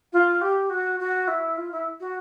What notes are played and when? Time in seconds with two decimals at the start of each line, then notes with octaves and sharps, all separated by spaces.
0.13 F4
0.41 G4
0.70 F#4
1.00 F#4
1.28 E4
1.57 F4
1.72 E4
2.00 F#4